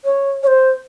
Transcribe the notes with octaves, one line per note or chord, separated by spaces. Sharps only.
C#5
C#5
C5